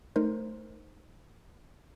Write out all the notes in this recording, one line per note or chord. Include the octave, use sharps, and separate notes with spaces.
A3 D#4 A#4 C5